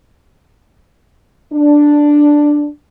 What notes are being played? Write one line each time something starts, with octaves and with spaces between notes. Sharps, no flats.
D4